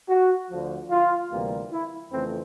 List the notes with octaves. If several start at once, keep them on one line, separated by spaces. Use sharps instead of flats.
F#4
D2 D3 F3
F4
D2 C3 E3 G3 A#3
E4
F2 C#3 E3 A3 C4